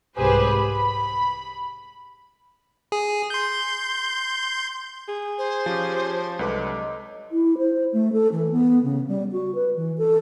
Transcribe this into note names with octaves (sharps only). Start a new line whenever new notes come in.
C2 G#2 G4 G#4 B4 C5
B5
G#4
C6 G6
G#4
C5
F3 C#4 G4
C2 D3 F#3 G#3 B4 D6
E4
C5
A3
A4
E3
B3
C#3
G3
F#4
B4
E3
A4